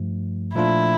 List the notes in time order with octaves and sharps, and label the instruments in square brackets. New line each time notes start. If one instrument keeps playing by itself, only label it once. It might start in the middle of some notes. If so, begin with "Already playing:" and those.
Already playing: [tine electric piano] G2 F3 A3
[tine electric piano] A#2 F3 A3 D4 F4 [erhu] E4